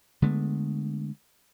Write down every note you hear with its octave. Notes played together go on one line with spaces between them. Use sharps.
D3 G#3 A3 B3